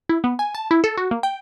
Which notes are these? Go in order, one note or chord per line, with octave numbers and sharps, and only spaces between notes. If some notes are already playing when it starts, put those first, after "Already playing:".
E4
B3
G#5
A5
E4
A4
F#4
A#3
G5